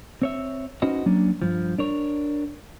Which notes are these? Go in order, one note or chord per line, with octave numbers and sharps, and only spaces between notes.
C4 C#5 E5
C#4 D#4 F#4 B4 C5 D#5
F#3 A#3 C#4 D4
G2 F3
D4 A#4 C#5